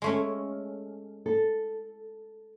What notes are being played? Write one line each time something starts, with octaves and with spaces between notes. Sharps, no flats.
G#3 A3 C#4
A4